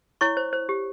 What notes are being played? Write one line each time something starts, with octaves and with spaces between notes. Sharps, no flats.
E4 C#5 C#6
C5
C5
G4